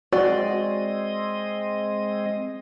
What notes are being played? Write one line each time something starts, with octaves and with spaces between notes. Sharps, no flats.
G#3 C4 F#4 D5 D#5